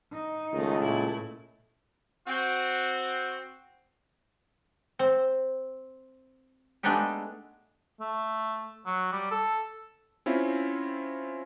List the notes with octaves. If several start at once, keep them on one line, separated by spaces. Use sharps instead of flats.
D#4
C#2 D#3 A3
A#2 A3 E4
C4 F#4
C4
G#3 A3 B3 D4 D#4 G4
A3
F#3
G3
A4
C4 C#4 E4 F4